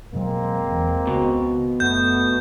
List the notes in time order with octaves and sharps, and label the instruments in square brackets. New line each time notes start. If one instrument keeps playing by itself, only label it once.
[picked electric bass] F2 B2 F#3 [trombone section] G#3 A#3 C4
[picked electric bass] E2
[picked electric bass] C#2 [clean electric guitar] B2
[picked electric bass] F#1 [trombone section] A3 B3 [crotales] G6